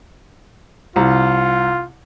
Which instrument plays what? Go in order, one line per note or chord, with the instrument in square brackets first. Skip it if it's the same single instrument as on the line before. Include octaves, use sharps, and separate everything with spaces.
[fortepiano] C2 [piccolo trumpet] F4